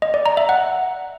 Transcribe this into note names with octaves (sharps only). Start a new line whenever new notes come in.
D#5
D5
A#5
E5
F#5